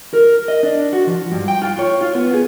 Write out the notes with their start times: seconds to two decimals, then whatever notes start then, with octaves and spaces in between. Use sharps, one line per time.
0.13 A#4
0.48 D#5
0.63 D4
0.93 F#4
1.07 F3
1.32 G2
1.48 G5
1.62 F4
1.79 C#5
2.01 F4
2.15 B3
2.34 G#4